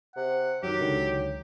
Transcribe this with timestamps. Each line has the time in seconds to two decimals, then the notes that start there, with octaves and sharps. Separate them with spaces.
0.16 C3 F#5
0.63 F#2 D#3 F#3 G4
0.80 C#2 D3 D#3